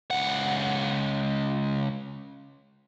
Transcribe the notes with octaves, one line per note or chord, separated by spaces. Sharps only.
C#2 F#5